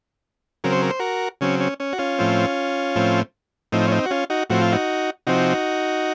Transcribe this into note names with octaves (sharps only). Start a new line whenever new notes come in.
C#3 F#3 C4 A#4
C5
A#4
C5
F#4 A#4
C#3 F#3 C4 C#4
C#4
C#4
F#4
C#4 F4
A2 F3 C4
A2 F3 C4
A2 F3 C4 D#4
C#4
C4 D#4
F#4
C#4 F4
D#4 F#4
A2 F3 C4 F#4
F4
D#4 F#4
C3 F3 C4 D#4 F#4